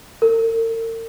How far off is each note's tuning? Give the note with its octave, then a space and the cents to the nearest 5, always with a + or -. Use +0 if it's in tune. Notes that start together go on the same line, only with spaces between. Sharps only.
A#4 -45